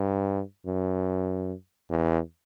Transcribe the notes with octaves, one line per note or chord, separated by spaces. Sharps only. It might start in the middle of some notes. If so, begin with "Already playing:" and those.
Already playing: G2
F#2
E2